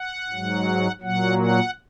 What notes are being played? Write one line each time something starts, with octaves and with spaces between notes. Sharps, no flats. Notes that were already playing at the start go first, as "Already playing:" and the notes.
Already playing: F#5
G#2 F#3
A#2 F#3 F#5
F#5